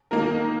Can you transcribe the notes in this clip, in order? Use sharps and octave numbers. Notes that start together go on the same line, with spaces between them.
D#3 A#3 D#4 A#4